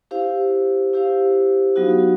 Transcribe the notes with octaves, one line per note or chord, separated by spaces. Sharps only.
E4 G4 C5 F5
E4 G4 C5 F5
F#3 B3 D#4 F#4